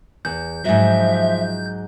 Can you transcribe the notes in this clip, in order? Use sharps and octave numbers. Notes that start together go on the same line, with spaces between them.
E2 G6
G#2 F3 F#3 E5